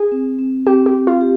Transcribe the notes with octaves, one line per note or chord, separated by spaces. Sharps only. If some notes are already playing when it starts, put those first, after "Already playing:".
Already playing: G#4
C4
C4
C4 G4
G4
C4
F4
G4